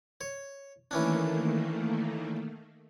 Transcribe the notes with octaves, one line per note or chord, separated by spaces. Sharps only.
C#5
D#3 E3 A3 A#3 C#4 D4